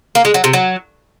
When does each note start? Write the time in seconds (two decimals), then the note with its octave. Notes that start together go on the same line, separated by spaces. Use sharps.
0.15 A#3
0.25 G#3
0.34 F#3
0.44 C3
0.53 F#3